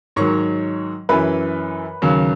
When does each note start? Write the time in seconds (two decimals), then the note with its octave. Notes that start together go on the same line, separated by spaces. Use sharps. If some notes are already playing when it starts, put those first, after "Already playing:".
0.16 G#2 D#3 F#3 C#5 C#6
1.09 F#2 E3 B4 B5
2.02 D#2 C#3 F#3